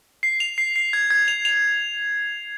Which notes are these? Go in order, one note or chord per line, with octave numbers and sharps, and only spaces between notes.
C7
F7
C7
C7
G#6
G#6
F7
F7